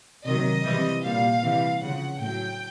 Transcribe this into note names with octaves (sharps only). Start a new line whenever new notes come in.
C3 D#3 F#3 D#5
C3 E3 G3
A#2 G3 F5
C3 E3 G3
C#3 F3 F#5
A2 F#3 G5